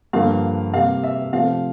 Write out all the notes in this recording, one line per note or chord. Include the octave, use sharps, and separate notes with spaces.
G2 D3 F3 A#3 F5
C3 G3 A#3 F5
E5
C3 F3 A3 F5